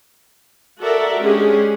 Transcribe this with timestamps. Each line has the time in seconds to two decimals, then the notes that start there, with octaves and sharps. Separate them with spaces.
0.81 F#4 A4 A#4 D5 E5 F#5
1.20 G#3 C#4 D4 G4 G#4